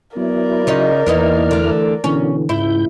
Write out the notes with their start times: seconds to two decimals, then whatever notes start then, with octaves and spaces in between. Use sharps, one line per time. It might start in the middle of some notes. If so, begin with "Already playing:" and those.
0.17 F#3 B3 E4 A#4 D5
0.67 C#3 C#4 D#4 F4
1.07 E2 E3 A#3 B3 D#4 E4 F6
1.51 D2 D3
2.04 B2 D3 E3 C#4
2.49 C#2 G#2 E4 G6